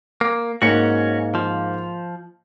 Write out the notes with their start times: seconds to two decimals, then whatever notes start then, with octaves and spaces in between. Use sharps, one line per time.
0.21 A#3
0.62 G#2 A#3 C#4 F#4 C#7
1.35 F3